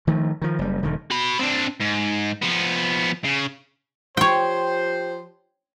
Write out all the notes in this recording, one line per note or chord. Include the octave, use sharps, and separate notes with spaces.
D#3 F3 A3
D#3 F3
F#1 G3
E1 D3 D#3
F#4 B5
C4 D4
G#2
F3 B3
C#3
F3 G4 C5 C#5 G5